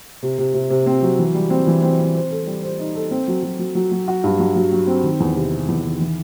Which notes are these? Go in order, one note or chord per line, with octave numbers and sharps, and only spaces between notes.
C3
C3
C3
C3
C4
F#3
E3
G3
C4
E3
C4
C4
C5
A4
G3
C5
D#4
A4
C4
F#3
F#3
F#3
F#3
F#3
F#4
G2
F#3
F#3
F#3
C4
D#3
E2
C3
C3
E2
D#3
E3